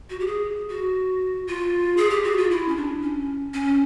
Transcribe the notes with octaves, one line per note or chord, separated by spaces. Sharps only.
F#4
G4
G#4
F#4
F4
G#4
G4
F#4
F4
E4
C#4
D4
C#4
C#4